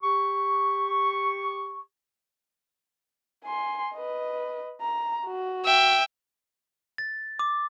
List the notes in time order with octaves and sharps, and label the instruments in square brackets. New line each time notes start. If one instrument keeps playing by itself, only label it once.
[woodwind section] G4 C#6
[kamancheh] G#5 C6
B4 D#5
A#5
F#4
[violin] E5 G5
[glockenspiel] A6
D6